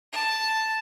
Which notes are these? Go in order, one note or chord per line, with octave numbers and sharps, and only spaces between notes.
A5